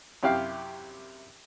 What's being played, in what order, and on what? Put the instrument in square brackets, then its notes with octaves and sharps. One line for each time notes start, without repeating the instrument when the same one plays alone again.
[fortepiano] F#2 C3 E4 G4 F5 G5